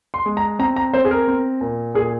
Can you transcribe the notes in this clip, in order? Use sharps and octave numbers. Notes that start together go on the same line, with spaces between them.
C6
G#3
A#5
C4 A#5
A#5
C4 C5
G#4
A#4
C4
A#2
A#2 G#4